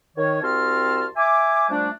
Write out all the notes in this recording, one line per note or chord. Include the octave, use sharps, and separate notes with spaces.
D#3 C#5
C2 C4 F#4 A5 C6 F6
E5 G#5 D6
F3 G3 A3 D4